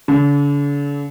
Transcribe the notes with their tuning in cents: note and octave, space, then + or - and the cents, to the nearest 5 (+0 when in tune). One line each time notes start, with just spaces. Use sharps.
D3 -45